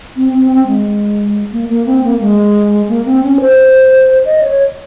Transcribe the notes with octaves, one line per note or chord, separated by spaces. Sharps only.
C4
C4
C4
G#3
A#3
A#3
C4
A#3
G#3
A#3
C4
C#4
C5
D#5
C#5